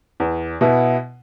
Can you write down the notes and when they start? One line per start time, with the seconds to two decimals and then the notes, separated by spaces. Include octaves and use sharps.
0.20 E2
0.61 B2 B3 E4